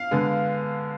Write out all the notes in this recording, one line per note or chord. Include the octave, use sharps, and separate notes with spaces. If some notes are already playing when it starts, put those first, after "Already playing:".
Already playing: F5
D3 G#3 B3